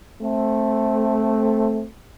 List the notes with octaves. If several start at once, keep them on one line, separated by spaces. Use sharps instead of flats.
A3 C4